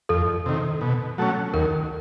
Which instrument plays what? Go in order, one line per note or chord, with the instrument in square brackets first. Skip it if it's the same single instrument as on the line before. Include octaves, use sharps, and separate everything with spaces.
[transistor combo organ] F2 [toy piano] A4
[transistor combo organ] C3 D#3
B2
F#3 A3 C#4
[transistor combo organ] D#2 [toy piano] A#4